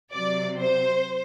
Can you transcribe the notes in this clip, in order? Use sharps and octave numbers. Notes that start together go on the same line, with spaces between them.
C3 F#3 D5
C5